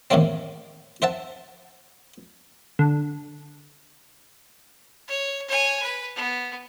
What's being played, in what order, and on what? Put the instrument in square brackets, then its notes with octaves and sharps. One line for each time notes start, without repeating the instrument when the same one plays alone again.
[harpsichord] D#2 A2 F3 G#3 A#3 C4
C5 E5 F#5 A5
[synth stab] D3
[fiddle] C#5
C#5 G#5
B4
B3